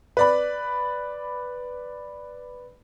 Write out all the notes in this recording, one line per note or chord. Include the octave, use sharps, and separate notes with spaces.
B4 D5 B5